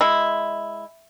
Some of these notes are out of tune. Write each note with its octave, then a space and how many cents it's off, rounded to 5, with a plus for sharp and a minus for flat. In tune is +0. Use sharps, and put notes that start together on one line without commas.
G#3 -5 E4 +0